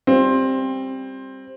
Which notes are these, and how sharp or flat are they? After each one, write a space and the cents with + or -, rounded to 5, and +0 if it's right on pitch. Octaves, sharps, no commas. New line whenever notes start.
G3 +10 C4 +15 F4 +0